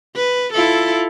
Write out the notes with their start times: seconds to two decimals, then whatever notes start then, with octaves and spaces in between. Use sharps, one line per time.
0.16 B4
0.54 E4 F4 A4